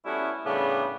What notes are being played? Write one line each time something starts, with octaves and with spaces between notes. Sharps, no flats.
G3 A3 B3 C#4 E4 F#4
A2 C#3 G3 A3 B3 D4